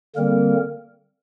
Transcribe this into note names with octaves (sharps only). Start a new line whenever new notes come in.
D3 G3 A#3 C4 A#4